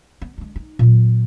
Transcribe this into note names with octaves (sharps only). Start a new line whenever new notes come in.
B3
G#3 D4
D#4
A#2 F#3